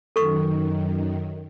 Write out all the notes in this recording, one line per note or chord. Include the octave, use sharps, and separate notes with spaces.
F#2 D#3 A4 C#6